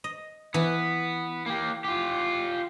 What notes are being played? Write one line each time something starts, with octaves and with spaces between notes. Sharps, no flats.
D#5
E3 B3
A#3 G4
F4 G4